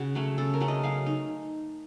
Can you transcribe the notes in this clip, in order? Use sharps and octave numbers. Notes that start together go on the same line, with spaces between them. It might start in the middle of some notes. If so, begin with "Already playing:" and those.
Already playing: C#3 F#4
F#3 A3 C#4
C#3 A4
A#4
F#3 A3 C#4
D#5
F#3 F5
D#4